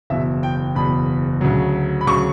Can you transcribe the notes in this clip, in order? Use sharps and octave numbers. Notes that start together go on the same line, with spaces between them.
F#1 E2 B2 E5
G5
F#1 E2 B2 B5
D2 C#3 F#3
B5
D2 C#3 F#3 C#6